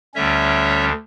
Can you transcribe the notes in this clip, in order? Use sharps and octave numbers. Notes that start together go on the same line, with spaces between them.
D2 D3 G3 C#4 C#5 E5